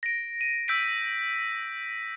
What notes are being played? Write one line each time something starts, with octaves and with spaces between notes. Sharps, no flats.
A#6 D7
D#7
E6 G6 B6 D7